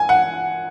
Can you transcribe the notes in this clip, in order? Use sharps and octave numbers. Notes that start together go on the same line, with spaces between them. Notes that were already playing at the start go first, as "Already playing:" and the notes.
Already playing: G#5
F#5